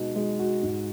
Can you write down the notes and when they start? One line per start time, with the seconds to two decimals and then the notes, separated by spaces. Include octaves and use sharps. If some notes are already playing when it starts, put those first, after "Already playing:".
Already playing: B2 G#3 D#4 F#4
0.15 G#3
0.39 F#4
0.63 G#2